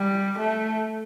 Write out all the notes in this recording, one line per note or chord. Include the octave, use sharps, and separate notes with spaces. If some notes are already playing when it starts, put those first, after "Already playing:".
Already playing: G3
A3